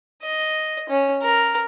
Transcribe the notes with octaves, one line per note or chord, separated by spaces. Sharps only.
D#5
C#4
A#4